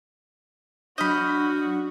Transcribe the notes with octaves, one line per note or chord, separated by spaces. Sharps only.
F#3 D4 F#4 D#5 B5 F6 G6